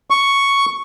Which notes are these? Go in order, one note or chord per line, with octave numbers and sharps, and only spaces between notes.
C#6